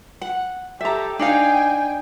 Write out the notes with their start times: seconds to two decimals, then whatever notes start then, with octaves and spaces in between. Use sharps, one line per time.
0.21 F#5
0.81 G4 A4 E5 A#5
1.19 D4 D#4 F5 G5 G#5